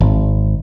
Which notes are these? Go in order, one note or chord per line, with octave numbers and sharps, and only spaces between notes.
G#1